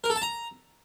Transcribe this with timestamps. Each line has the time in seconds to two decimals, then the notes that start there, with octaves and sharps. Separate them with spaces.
0.04 A#4
0.10 A4
0.16 A5
0.22 A#5